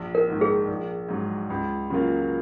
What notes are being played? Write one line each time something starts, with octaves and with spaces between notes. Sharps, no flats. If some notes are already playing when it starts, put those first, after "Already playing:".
Already playing: A#1
A#4
G#2 D#3 A#3
G#4
A#1
G#2 F#3
C#2
C#3 F#3 A#3 F4